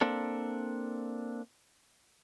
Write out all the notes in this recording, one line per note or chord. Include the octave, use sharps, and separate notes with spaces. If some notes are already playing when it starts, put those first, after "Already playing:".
A#3 C4 D4 A4